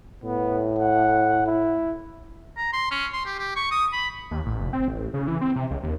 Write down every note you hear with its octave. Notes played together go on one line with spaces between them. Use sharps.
A2 B3
F#5
E4
A#5
C6
C#4
C6
G4
G4
C#6
D#6
B5
D#2
A1
F1
C4
A1
C#3
E3
C4
C3
C#2
D#2